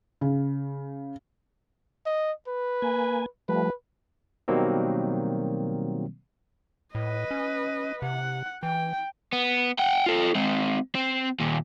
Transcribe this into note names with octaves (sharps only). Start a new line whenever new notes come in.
C#3
D#5
B4
A#3 G#5
F3 G3 A3 B4
B2 D#3 F#3 G3 A#3 C4
A2 B4 D#5
C#4
C3 F#5
E3 G5
B3
F#5 G5
F4 A4
G#3 C4
C4
D#2 A#2